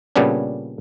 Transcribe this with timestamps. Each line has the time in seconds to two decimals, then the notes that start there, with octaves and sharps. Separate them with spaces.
0.16 A#2 C#3 G3 B3 C#4 D4